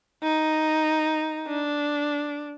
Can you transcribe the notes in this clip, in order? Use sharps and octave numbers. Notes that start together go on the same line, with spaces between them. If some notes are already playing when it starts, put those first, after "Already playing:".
D#4
D4